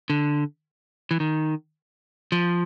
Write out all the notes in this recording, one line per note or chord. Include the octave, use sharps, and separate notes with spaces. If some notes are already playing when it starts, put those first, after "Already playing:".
D3
E3
D#3
F3